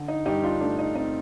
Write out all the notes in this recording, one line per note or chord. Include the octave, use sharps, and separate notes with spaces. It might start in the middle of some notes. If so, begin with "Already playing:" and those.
Already playing: D3
D#4
G2 D#4 G4
D4 F4
A3 D4
D#4
C4 D#4